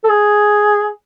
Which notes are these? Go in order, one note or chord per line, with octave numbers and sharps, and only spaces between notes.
A4
G#4